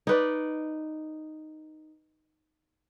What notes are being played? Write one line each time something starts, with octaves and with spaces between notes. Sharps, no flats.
D#4 B4 D5